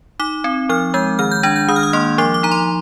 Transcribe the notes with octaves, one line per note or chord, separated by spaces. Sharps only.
D#4 D6
C4
F3 F6
G#3 G6
D#3 F6
G6
D4 G#6
G6
D#3 D#6
F6
D#6
A#3 C6
F3 D6
D6
D#4 A#5
C6